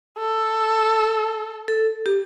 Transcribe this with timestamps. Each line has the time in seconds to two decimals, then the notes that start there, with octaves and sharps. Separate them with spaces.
0.18 A4
1.68 A4
2.06 G4